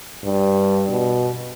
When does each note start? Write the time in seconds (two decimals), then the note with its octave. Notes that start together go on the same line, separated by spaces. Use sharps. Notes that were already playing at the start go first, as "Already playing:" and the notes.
0.24 G2
0.89 B2